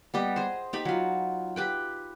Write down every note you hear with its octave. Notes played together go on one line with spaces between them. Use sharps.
G3 B3 G4 D#5
G#4 C5
D#4 G4 B5
F#3 F4
G4 B4 G5